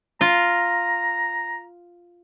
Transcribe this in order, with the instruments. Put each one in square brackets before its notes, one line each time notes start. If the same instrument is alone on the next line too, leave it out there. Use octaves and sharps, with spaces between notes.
[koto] F4 [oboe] A#5